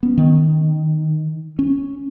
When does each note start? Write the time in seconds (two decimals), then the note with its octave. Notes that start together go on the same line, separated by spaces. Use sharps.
0.03 B3 C#4
0.18 D#3
1.59 C#4